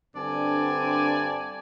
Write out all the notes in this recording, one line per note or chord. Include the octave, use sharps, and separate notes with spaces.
G2 D3 C4 D5 G#5 A5